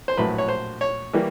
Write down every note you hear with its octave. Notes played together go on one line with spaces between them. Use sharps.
C5
A#1 A2 F#3 B4
C#5
C5
C#5
E3 G3 A#3